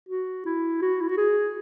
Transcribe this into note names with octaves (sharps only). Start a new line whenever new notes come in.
F#4
E4
F#4
E4
F#4
G#4